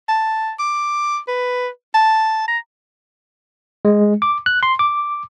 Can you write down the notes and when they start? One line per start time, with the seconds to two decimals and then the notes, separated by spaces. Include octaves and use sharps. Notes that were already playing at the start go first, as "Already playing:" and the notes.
0.08 A5
0.60 D6
1.28 B4
1.94 A5
2.48 A#5
3.85 G#3
4.22 D6
4.46 F#6
4.63 C6
4.79 D6